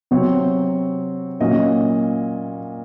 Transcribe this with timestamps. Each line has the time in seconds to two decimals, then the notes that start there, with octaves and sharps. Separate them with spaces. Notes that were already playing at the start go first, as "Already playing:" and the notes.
0.11 C3 F#3 C4 C#5
1.40 A#2 F#3 C#4 D#5